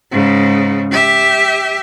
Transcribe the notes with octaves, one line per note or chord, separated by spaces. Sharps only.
G#2 C#3
G4 E5